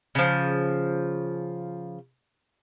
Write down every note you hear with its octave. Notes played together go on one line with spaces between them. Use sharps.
C#3 F3